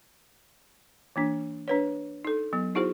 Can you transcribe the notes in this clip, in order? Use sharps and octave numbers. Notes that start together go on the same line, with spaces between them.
E3 A#3 D4
D4 B4 C#5
D#4 A4
F#3 B3
D#4 E4 F#4 G#4 C5